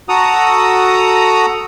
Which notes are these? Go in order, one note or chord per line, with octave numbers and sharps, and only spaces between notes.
F#4 A4 F#5 A#5 D#6